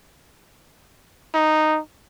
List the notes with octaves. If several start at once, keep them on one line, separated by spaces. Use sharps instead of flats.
D#4